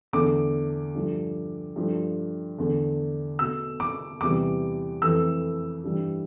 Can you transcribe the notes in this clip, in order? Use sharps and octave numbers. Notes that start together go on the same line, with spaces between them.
E2 D3 A3 D6
G2 F3 A3
G2 F3 A3
E2 D3 A3
B2 A3 E6
D6
E2 C3 E3 G3 D6
F2 E3 A3 E6
G2 E3 G3